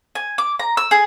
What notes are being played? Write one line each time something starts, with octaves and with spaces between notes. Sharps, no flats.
G#5
D6
A#5
E6
G#4